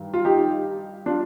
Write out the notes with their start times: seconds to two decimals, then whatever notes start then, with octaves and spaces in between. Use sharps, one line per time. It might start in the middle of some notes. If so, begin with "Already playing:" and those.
Already playing: G2 D#3
0.14 F4
0.25 D#4 G4
1.06 D4 F4